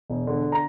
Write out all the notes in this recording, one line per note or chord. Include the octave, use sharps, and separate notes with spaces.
E1
D3
A#5